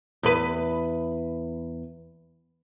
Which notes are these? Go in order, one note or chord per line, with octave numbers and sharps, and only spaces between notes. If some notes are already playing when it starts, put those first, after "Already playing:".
E2 B4